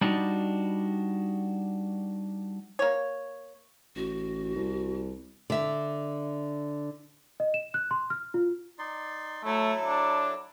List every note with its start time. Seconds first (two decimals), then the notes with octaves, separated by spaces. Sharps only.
0.01 G3 D4 D#4 F#4
2.79 A#3 C#5
3.96 A1 F#4
4.55 C2
5.50 D3 E5
7.40 D#5
7.54 E7
7.74 F#6
7.91 C6
8.10 F6
8.34 F4
8.79 D#4 D5 C6
9.45 F#3 A3 E4 A4
9.84 D4